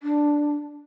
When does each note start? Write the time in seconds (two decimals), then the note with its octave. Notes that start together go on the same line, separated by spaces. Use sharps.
0.03 D4